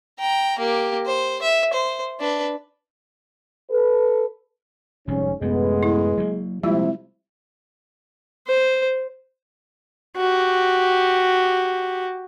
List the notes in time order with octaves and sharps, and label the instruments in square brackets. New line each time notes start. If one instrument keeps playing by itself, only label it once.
[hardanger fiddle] G5 A#5
A#3 G4
C5
E5
C5
D4 B4
[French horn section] A4 B4
[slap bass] F1 C3 F3 [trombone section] G#2 G3 C#4
[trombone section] A1 A3 B3 [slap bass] F#2 C3 [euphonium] G#3
[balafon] E4
[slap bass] F#3 G3 A#3
[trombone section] C3 [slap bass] F3 A#3 [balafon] G3 G#3 F4 [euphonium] E4
[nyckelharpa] C5
[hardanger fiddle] F#4 G4